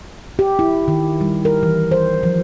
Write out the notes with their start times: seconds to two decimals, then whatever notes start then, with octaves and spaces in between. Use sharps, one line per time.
0.39 G4
0.59 E4
0.88 D#3
1.21 G3
1.45 A#4
1.63 E3
1.91 C5
2.23 F3